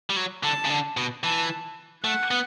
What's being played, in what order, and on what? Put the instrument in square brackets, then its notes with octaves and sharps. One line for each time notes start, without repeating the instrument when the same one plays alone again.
[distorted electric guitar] G3
F#3
[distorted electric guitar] D3 [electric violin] A5
[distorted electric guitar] C#3
D3
B2
[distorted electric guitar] E3 [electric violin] A5
[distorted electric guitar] A3 [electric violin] F#5
[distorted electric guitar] B3